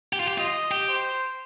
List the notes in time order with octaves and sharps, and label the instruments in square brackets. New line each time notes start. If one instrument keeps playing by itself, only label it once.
[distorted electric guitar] G4
F4
G4
[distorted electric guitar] F4 [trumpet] D#5
[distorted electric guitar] G4
[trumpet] C5